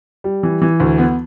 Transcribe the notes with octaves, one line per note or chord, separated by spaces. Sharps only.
G3
E3
E3
D2
B3